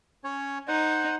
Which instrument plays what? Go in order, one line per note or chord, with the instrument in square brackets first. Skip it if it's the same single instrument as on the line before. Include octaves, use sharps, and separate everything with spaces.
[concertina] C#4 C#5
[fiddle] D#4 [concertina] C5 F#5